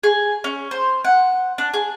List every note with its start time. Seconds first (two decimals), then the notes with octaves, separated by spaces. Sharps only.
0.03 G#4
0.44 C#4
0.71 C5
1.05 F#5
1.58 D4
1.74 G#4